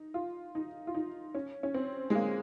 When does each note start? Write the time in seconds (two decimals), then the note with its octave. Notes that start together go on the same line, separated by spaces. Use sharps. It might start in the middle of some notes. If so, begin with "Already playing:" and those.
Already playing: D#4
0.14 F4
0.55 D#4
0.87 F4
0.94 D#4
1.34 C#4
1.63 C#4
1.74 C4
2.10 G#3
2.15 A#3